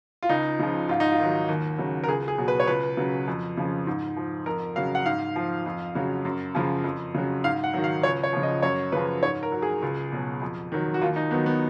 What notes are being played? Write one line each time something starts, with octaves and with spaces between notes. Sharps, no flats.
F4
C#2 D#4
C#3 F3
G#2 F4
D#4
F4
D#3 F#3
D#2
C#3 F#3
A#4
C#2 G#4
G#4
B2 F#3
B4
C#5
C#2 B4
C#3 F#3
F2
C#3 F3
G#2
F3
F2 A#4
C#3 F#3 F5
F#5
G#2 F5
F3
F2
C#3 F#3
F#2
C#3 F3
F2
C#3 F#3
G#2 F5
F#5
D#3 F#3
F5
C#2 C#5
C#5
C#3 F3
D#5
F#2 C#5
C#3 F3 B4
G#2 C#5
A#4
F#3
G#4
C#2
B2 F#3
F2
D#3 F#3
F#4
D#2 F4
D#4
D#3 F#3 B3
B3